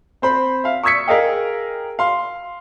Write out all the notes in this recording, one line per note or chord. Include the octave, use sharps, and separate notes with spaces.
C4 C5 B5
E5 F5
C#6 D#6 E6 G#6 B6 C#7
G#4 A#4 D#5 F5 G5
F5 C6